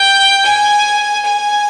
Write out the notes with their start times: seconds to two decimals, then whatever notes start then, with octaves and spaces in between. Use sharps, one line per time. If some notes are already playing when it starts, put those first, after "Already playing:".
Already playing: G5
0.44 G#5
1.25 G#5